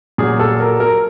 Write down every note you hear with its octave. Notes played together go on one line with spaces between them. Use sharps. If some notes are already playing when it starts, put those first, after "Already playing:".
A#2 F#3 G#4
A4
A#4
A#4